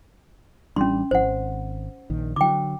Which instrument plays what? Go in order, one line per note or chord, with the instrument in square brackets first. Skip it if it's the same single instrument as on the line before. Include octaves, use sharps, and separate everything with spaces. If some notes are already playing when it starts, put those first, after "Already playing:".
[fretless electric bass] A1 G3 D4 [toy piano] C#4 C6
[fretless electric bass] G#1 [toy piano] C5 F#5
[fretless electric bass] A#1 D#3
[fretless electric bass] D3 F#3 [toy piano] G5 D6